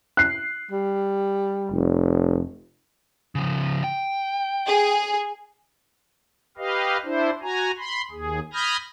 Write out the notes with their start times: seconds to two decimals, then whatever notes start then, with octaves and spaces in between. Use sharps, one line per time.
0.17 F#6 C7
0.71 G3
1.72 F1
3.35 C#3 F3
3.84 G5
4.65 G#4
6.58 G4 B4 D#5 F5
7.04 D4 E4 C5
7.42 F#4 G#5 A#5
7.78 B5 C6
8.11 D#2 G#4
8.53 B5 D#6 F6 G6 G#6 A#6